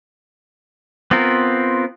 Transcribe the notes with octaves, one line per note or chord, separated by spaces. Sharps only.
B3 C4 F4 A#4